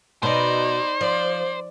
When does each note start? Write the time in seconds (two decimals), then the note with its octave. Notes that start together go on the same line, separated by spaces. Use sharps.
0.23 B2 D#4 C5 D5
1.01 F3 D5